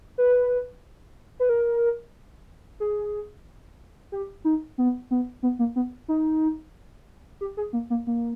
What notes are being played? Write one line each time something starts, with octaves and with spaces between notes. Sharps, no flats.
B4
B4
A#4
G#4
G4
D#4
B3
B3
B3
A#3
B3
D#4
G4
G#4
A#3
A#3
A#3